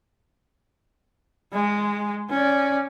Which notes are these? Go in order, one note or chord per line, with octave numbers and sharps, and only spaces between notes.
G#3
C#4 D5